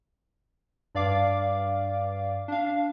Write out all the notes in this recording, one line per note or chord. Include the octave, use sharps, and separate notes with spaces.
G2 D5 F5 D6
D4 F5